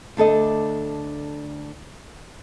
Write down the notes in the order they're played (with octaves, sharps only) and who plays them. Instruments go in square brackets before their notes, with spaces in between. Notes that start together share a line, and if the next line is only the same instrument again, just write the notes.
[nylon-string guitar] D2 D4 A4 D#5